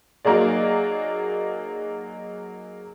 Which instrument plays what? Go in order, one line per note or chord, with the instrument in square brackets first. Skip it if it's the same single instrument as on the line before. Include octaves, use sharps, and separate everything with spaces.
[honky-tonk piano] F#3 A#3 D#4 G#4 D5